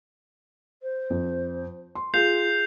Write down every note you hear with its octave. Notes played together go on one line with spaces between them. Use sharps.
C5
F2
C6
F4 G#4 F5 G6 C7 F7